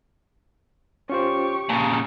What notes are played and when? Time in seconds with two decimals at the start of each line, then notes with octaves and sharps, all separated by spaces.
1.10 C#4 F4 G4 C5 C#6
1.69 A#2 C#3 A5 A#5